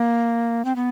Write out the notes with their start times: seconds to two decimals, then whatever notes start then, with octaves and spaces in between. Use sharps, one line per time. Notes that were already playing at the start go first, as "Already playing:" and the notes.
Already playing: A#3
0.65 C4
0.76 B3